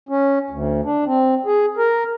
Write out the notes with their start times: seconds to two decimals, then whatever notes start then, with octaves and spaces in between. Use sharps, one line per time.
0.09 C#4
0.50 D2
0.84 D4
1.06 C4
1.46 G#4
1.77 A#4